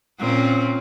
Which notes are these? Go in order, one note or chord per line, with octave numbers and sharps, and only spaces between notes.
A#2 C4 C#4